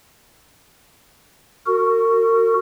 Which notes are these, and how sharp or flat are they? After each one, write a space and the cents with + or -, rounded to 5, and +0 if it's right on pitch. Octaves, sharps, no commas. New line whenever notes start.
F#4 +0 A#4 -35